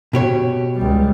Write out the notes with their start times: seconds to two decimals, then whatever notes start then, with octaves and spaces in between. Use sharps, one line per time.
0.13 B2 G4 C#5
0.75 C#2 G3